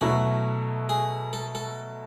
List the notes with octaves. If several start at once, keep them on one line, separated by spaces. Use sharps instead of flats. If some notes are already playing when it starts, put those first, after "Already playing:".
B2 F#3 A3 E4 F#4
G#4
A4
A4